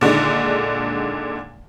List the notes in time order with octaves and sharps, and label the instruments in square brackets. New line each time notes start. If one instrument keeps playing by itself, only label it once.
[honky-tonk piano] A#2 D3 D#3 G#3